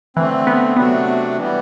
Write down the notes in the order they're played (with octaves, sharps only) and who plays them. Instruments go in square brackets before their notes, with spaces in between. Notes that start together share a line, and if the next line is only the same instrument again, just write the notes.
[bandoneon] D3 A3 C4 [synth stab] E3
[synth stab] B3
[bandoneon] C3 F#3 A3 D4 F#4 [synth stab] B3
[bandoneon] E3 G3 B3